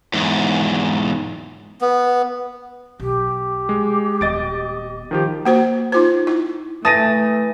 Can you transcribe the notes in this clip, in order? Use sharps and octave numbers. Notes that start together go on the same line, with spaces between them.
E2 G#2
B3
B1 G4
G#3
D#1 B3 D#5 A6 D7
D#3 F3 G4
A#3 F#4 C5
D#4 F4 C5
E4
E3 A3 A5 D#6 A#6 D#7